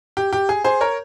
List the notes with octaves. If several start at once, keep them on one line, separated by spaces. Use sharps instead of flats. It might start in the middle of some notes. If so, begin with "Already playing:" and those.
G4
G4
G#4
G#4 C5
A#4 C#5